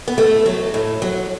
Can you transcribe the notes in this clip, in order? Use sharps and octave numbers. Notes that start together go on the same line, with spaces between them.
B3
A2 A3
F#3
A2
F#3